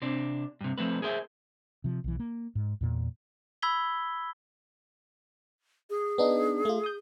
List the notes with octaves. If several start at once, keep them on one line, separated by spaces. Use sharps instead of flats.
C3 C4 D4
G2 C3
F3 A3 C4 B4
G#4 A#4 C5 D#5 E5
C3 F3
B1 E3
A#3
G#2
E2 A#2
B5 E6 G#6 B6 G7
G#4
B3 D4 D#4
A3 F4
D#6 G6